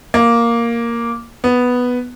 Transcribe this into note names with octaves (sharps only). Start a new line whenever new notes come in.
A#3
B3